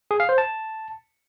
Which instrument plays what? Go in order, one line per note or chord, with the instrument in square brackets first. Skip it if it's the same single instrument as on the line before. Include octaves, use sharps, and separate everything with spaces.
[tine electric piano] G#4
F5
C5
A5